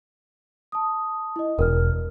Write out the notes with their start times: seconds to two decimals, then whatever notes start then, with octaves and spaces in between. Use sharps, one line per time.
0.72 A5 D#6
1.36 E4 D#5
1.59 E1 A#4 F6